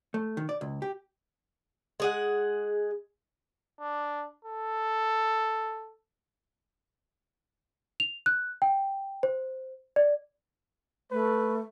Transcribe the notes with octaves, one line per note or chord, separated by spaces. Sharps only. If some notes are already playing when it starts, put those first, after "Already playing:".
A3
D#3
D5
C#2
G4
G#3 G#4 F#5
D4
A4
F7
F#6
G5
C5
D5
A3 B4